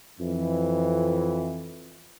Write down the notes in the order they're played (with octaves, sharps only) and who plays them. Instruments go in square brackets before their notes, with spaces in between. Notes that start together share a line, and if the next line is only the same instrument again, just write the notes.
[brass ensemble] F2 E3